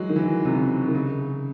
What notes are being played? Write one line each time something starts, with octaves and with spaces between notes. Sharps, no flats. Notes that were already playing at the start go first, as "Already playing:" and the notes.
Already playing: E3 F#3 G#3
D#3
E3
C3
C#3
D#3
C#3